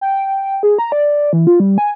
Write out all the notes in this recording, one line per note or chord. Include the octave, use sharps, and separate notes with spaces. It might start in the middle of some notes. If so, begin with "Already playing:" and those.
G5
G#4
A#5
D5
E3
F4
G3
G#5